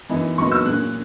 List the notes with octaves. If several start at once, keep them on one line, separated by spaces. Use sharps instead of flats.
F#2 E3 B3 D#4
A#2 F#3 B3 D#4 C#6
E6
A#2 A#3 C#4 F#6